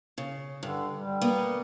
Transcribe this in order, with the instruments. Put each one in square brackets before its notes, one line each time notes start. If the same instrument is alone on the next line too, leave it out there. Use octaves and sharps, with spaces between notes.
[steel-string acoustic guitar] C#3
[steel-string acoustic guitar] G2 [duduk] D3
[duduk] G3
[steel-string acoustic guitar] A#3 B3